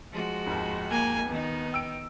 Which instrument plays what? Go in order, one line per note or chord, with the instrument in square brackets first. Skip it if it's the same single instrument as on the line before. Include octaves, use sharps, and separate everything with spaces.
[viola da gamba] F3 G#3 F#4
[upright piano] G#1 D#2
[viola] A#3 G#5
[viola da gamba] D#3 D#4 [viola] B3
[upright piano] G5 E6 D7